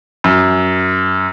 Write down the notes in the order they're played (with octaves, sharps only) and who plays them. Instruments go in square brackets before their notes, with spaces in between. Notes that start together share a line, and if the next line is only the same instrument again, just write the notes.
[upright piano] F#2